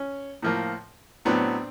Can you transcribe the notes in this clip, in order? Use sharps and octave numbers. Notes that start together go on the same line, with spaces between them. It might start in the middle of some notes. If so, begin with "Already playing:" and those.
Already playing: C#4
A2 F3 A#3
A2 F#3 B3 C4 D4